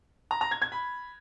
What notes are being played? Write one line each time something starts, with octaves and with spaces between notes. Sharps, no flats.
A#5
A#5
G#6
G#6
B5